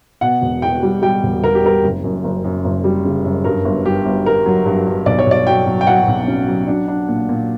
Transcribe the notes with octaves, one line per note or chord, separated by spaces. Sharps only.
B2 F#5
E1
E2 G5
G3
G3 G5
E1
E1 A#4
G4
G3 A#4
F#1
F#2
F#1
F#2
F#1
G3
C#3
F#2
G2 A#4
G1
G2 G4
G1
G2 A#4
F#3
G2
G2
B1 D5
C#5
B1 D5
F#3 G5
F#3
G5
F#3 F#5
B1
C#4
F#3
D4
D4
A#2
A#2